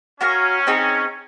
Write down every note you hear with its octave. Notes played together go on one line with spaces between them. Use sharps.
C#4 F#4 A#4 F5
C4 D#4 G#4 C#5